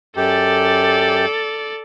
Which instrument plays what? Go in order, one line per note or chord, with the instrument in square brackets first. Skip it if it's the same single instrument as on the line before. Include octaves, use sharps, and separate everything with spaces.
[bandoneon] F#2 G4 [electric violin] A4 D5